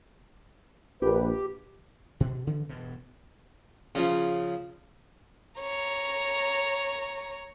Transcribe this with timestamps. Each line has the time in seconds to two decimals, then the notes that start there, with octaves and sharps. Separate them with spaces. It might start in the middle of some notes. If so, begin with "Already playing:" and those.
1.02 A#1 G4 B4
2.20 B2
2.47 C#3 E3 F3
2.69 E1 G2 B2
3.95 C#3 F3
5.61 C#5 A#5